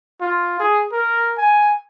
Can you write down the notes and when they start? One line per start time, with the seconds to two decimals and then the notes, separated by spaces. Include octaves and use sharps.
0.21 F4
0.60 G#4
0.92 A#4
1.38 G#5